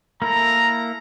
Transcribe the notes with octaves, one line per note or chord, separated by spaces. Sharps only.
A#3 E4 A4 A#5